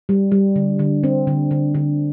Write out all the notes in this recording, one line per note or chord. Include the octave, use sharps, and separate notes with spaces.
G3
G3
D3
D3
C4
D3
D3
D3